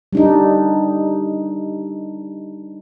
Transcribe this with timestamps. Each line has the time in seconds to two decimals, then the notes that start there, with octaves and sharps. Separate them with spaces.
0.13 G3 D4 D#4